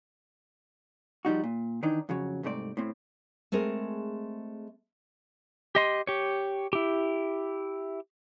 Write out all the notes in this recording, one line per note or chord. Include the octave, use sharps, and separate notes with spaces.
F3 G3 D#4 F#4
A#2
D#3 E3 D4 D#4
F2 C#3 F#3
C2 G#2 A3 C4 D5
A2 C4
G#3 A3 C4 G#4 A#4
G4 D#5 C6
G4 C#5
E4 G4